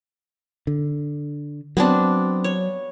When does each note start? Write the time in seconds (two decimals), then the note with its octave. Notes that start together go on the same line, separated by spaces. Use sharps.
0.67 D3
1.77 F#3 B3 C4 D4
2.44 C#5